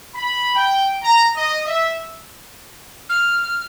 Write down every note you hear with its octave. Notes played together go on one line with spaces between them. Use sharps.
B5
G5
A#5
D#5
E5
F6